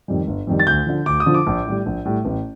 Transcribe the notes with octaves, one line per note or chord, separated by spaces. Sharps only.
F2 D#3 G3
G1
F2 D#3 G3
A6
D2 G6
D3 F3
D2 D6
D#6
D3 F3
D6
A#1
A2 G3
A#1
A2 G3
A1